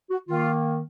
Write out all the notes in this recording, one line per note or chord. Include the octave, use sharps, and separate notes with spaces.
F#4
D#3 A#3 F4